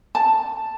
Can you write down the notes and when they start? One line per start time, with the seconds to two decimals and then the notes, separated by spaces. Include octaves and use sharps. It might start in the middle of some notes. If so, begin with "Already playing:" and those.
0.15 A5